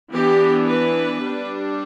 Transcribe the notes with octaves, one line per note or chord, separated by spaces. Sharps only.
E3 B3 D4 G4
B4
G3 D4